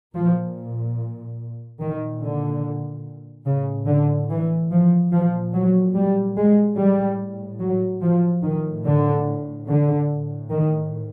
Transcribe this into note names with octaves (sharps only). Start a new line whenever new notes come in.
A#2 F3
A#2 D#3
D3
A2 C#3
D3
E3
F3
A#2 F3
F#3
G3
G#3
A2 G3
F#3
F3
A2 D#3
D3
D3
A2
D#3